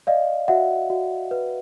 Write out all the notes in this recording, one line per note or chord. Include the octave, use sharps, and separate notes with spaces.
D5 D#5 F5
F#4 E5 F#5
F#4
B4